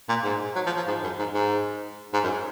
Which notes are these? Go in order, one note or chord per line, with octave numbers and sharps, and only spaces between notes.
A#2
G#2
F#3
F3
F3
G#2
F#2
G#2
G#2
G#2
F#2